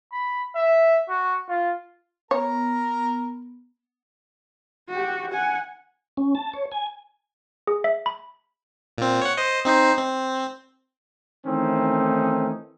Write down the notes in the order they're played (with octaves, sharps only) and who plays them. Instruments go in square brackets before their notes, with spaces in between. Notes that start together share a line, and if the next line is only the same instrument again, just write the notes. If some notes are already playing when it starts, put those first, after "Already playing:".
[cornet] B5
E5
F#4
F4
[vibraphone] B3 [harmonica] A#4 A#5 [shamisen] C#5
[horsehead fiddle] F#4 G4
F#5 G#5
[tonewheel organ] C#4
A5
C#5
G#5
[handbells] G#4
E5
B5
[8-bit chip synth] A#2 C4
C#5 F#5
C5 D#5
C4 D#4 C5
C4
[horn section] D#3 E3 A3 C4 C#4 D#4